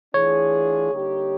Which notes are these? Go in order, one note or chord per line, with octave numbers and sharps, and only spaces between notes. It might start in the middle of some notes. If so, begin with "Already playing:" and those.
E3 A3 D4 F4 G#4 C#5
D3 G3 A#3 D#4 G4